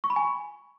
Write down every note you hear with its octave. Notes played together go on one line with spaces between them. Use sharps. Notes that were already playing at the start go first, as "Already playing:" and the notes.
C#6
B5
G#5